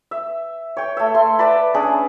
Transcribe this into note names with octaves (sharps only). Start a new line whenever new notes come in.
E5
C#5 G5
A3 E5
A3 C6
B4 D5 A5 B5
C#4 D4 G#4